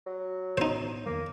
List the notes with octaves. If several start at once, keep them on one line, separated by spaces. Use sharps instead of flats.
F#3
A2 B3 C#4 D#4 C5
E2 D#3 G3 A#3